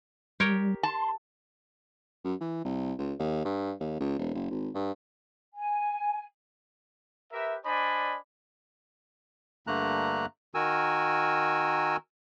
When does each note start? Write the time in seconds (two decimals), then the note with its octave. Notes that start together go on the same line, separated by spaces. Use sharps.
0.40 G3 G4 A#4 C#5
0.83 A5 C6
2.25 F#2
2.40 E3
2.65 C2
2.99 C#2
3.19 D#2
3.45 G2
3.80 D#2
4.00 C#2
4.19 E1
4.35 F#1
4.51 G#1
4.75 G2
5.53 G#5
7.33 G4 A#4 B4 E5
7.65 D4 C5 D5 D#5 G#5 B5
9.67 G2 D3 A3 A#3 A#5 F#6
10.55 D#3 F#4 A#4 G#5 E6